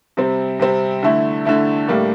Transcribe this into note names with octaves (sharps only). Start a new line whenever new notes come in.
C3 G3 C4
C3 G3 C4
D3 A3 E4
D3 A3 E4
A2 G3 A#3 D4